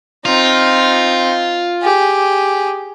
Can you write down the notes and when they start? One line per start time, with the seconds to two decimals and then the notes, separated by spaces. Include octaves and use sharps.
0.25 C4 D#4 F4
1.82 G4 G#4